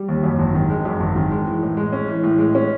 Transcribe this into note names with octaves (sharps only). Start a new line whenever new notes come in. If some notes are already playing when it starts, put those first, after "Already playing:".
Already playing: G3
D#2
F#2
G#1
D#3
G#3
F#2
G#1
D#3
G#3
E3
A2
G#3
C#4
E3
A2
G#3
C#4